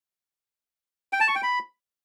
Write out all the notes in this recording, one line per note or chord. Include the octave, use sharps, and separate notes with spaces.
G5
A5
C#6
G5
B5